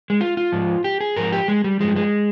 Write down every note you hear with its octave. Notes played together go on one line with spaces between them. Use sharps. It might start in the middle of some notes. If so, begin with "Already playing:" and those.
G#3
F4
F4
G#2 F3
G4
G#4
G#2 F3 A#4
G4
G#3
G3
G2 F3 G#3
G#3